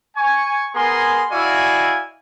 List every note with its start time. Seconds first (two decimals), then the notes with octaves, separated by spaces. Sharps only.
0.16 G#5 C#6
0.75 B3 G#4 A#4 G#5 A#5 C6
1.31 E4 F#4 D5 D#5 F5 G#5